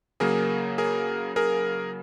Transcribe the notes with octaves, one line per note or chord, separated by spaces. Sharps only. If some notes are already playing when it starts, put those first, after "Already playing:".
C#3 F#3 A#3 G#4 A#4
G#4 A#4
G#4 A#4